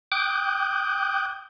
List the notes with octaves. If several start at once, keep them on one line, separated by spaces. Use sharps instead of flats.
G5 D6 D#6 F#6 G6